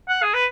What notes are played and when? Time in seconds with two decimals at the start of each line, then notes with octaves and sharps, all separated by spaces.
0.09 F#5
0.22 G#4
0.34 B4